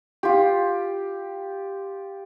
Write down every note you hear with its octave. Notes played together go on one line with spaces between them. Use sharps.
F4 G4